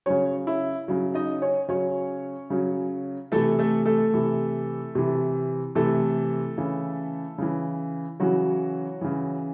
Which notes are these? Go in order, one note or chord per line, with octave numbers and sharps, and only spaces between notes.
C#3 F#3 C#4 C#5
E4
C#3 F#3
D#4 D#5
C#4 C#5
C#3 F#3 C#4 C#5
C#3 F#3
C3 E3 A3 A4
A3 A4
A3 A4
C3 E3
C3 E3
C3 E3 A3 A4
C#3 E3
C#3 E3
C#3 E3 F#3 F#4
C#3 E3